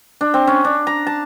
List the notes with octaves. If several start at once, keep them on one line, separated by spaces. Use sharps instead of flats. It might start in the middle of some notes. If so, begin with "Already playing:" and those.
D4
C4
C#4
D4
A#5
A5